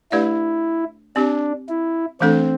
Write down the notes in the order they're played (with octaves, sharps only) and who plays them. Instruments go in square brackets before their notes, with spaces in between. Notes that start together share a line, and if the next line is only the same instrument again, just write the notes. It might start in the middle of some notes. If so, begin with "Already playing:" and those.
[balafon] A3 D4 G4 B4 D5 [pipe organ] E4
[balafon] C4 G4 D5 [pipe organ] D4
[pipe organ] E4
[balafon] E3 A3 D4 A4 [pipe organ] C4